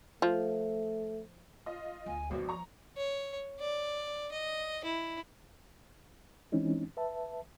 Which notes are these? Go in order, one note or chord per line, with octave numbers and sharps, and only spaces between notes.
F3 A3
F4 D#5
D2 G#5
G#1 G2 B2 F3 F#4
A#5 C#6
C#5
D5
D#5
E4
E3 G#3 C4 C#4 D#4 E4
B4 E5 A5